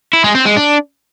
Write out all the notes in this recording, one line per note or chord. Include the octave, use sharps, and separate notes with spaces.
E4
G#3
C4
G#3
D4